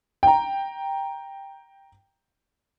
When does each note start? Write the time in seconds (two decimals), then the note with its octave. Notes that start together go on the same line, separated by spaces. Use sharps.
0.23 G5 A#5